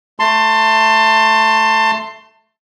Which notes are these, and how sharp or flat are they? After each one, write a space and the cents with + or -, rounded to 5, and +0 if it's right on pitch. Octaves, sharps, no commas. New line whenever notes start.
A3 +0 A5 +25 C6 +0